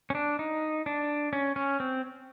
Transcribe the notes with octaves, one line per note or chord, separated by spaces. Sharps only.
C#4
D4
D#4
D4
C#4
C#4
C4